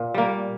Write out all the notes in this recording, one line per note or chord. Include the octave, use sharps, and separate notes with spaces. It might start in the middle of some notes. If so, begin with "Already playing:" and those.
Already playing: A#2
G3 A#3